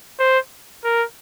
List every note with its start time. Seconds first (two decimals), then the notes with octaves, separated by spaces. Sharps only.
0.19 C5
0.84 A#4